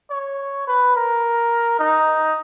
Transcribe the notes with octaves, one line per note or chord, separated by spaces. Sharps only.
C#5
B4
A#4
D#4